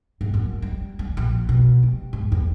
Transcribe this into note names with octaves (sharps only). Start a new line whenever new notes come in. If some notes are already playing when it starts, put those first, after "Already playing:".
G#2
F#2
G3
D3
A#1
B2
G3
G#2
E2